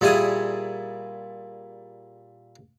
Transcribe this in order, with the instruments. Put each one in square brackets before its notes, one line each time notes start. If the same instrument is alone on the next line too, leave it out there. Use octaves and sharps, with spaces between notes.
[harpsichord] A#2 G3 E4 G#4 D#6